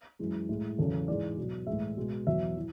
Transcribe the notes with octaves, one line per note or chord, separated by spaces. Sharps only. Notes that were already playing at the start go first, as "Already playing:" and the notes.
F#2 E3 G#3
A2 G#3
E2 C#3 F#3 A4
G#2 E3 G#3 D5
B2 F#3
A2 E3 G#3 E5
B2 G#3
E2 B2 F#3 E5
E3